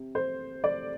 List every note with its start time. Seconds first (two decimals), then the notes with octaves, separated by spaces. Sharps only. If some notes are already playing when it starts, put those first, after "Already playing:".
Already playing: C3
0.15 C5
0.64 D5